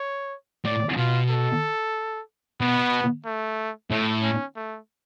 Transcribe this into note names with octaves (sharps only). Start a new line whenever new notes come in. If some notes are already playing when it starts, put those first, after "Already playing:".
Already playing: C#5
A2 D5
B2 F4
A4
B2 B3
A3
A2 A3
C#4
A3